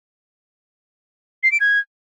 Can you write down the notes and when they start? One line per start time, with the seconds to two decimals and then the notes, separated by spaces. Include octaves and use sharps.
1.43 C7
1.52 D7
1.60 G#6